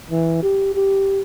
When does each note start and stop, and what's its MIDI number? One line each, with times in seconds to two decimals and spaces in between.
0.11 0.40 52
0.43 0.72 67
0.75 1.22 67